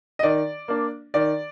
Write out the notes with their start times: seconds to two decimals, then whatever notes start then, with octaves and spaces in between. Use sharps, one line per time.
0.19 D#5
0.23 D#3 D5
0.68 A#3 D4
1.14 D#3 D5